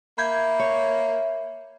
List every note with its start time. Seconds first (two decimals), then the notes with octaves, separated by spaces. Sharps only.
0.18 A#3 E5 B5 G6 G#6
0.60 C#5